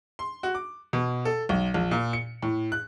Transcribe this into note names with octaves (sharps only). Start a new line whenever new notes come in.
C6
F#4
D6
B2
A4
B1
A#1
A#2
C#7
A2
F#6